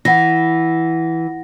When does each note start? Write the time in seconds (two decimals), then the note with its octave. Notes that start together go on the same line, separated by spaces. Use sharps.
0.05 E3 F#5 A#6